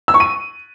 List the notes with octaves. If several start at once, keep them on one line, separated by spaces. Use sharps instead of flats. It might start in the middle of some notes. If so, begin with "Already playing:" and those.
E6
C#6
D#7